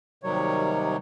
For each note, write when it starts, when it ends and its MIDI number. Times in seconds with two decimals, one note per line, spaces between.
0.24 0.96 39
0.24 0.96 48
0.24 0.96 51
0.24 0.96 54
0.24 0.96 55
0.24 0.96 73